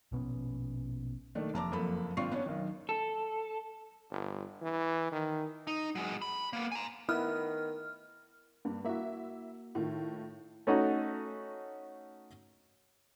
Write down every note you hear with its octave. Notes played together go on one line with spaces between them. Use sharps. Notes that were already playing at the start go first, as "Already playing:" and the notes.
A#1 B2 B3 C#4
D#3 A3 D4
F1 A5 A#5 D6
F#1 F2 A#3 A4 B5
G#1 C4 D4 F4 C#6 C7
B3 C#4 D4 C#5
B1 D#3
A4
G1
E3
D#3
D#4
F#3 G#3
B5
A#3 B3
G#5 A#5
D#3 B3 E4 F6
G2 A#3
A#3 E4 F#4 E5
A2 D#3 F4
A3 C#4 D#4 F#4